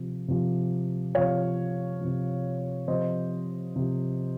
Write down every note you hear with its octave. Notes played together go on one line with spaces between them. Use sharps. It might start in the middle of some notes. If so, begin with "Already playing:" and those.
Already playing: C3 F3
C3 F3
C3 F3 C#5 F5
C3 F3
C3 F3 C5 D#5
C3 F3